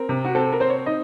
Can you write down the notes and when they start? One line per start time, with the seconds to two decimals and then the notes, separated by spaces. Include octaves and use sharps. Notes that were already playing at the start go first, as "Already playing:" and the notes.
Already playing: C4 A#4
0.09 C3
0.25 F#4
0.35 C4 A4
0.53 A#4
0.60 C4 C5
0.70 C#5
0.86 D#4 D#5